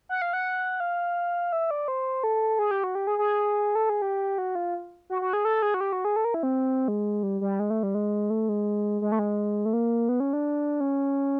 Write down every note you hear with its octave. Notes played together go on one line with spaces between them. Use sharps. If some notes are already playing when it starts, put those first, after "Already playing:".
F#5
F5
F#5
F5
E5
D5
C5
A4
G#4
G4
F#4
G4
G#4
G#4
A4
G#4
G4
F#4
F4
F#4
F#4
G#4
A4
G#4
F#4
G4
F#4
G#4
A4
A#4
E4
C4
G#3
G3
G3
G#3
A3
G3
G#3
A3
G#3
G#3
A3
G#3
A3
A#3
B3
C#4
D4
C#4